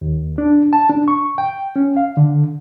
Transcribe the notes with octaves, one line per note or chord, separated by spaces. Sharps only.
D#2
D4
A5
D4
C#6
G5
C#4
F5
D3